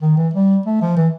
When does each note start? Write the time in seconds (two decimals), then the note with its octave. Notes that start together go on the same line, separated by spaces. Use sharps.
0.01 D#3
0.17 E3
0.33 G3
0.66 A3
0.82 F3
0.96 E3